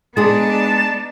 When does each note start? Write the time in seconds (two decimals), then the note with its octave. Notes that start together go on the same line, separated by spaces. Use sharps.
0.17 G#3 B3 D4 D#4 G#4 A5